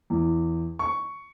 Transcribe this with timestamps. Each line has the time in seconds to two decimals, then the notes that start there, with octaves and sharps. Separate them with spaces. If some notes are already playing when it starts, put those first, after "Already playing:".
0.10 E2
0.79 C#6